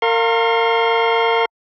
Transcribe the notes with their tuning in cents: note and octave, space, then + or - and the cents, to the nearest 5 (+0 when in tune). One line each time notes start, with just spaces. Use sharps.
A#4 -30 F5 +0 C6 +40